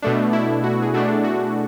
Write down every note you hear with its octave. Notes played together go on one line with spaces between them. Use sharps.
B2 A3 D4
E4
F#4
G#4
B2 A3 D4 F#4
F#4